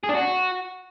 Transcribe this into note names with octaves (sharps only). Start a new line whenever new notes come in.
G#4
D4
F#4